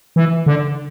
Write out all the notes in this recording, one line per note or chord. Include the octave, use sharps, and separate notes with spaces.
E3
D3